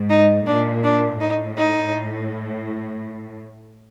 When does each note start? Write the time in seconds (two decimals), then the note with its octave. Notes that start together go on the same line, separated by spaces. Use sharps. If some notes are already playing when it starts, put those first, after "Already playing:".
Already playing: G#2
0.10 D#4
0.46 A#2 D4
0.84 D4
1.20 A2 D#4
1.58 D#4